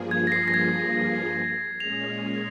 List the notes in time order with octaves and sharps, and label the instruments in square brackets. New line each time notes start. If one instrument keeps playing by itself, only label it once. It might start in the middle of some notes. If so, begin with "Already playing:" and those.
Already playing: [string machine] G2 F3 A#3 F4 G#4
[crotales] G#6
A#6
C7
A#6
G#6
[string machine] A#2 G#3 C#4 G#4 [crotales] F7